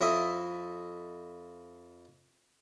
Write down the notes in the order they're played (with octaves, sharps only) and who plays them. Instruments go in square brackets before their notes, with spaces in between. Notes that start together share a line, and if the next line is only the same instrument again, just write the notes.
[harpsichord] F2 E4 D#5 E5 D#6